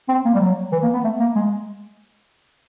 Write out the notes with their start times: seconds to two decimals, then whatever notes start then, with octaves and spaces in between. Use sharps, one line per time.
0.08 C4
0.25 A#3
0.34 G3
0.40 F#3
0.72 E3
0.83 A#3
0.93 B3
1.04 A3
1.20 A#3
1.35 G#3